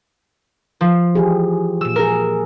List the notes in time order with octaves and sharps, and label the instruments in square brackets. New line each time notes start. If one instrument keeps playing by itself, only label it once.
[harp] F3
[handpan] E3 G4 G#4
[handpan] A#2 F3 [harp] E6 E7
[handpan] A#2 G#4 [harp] A#4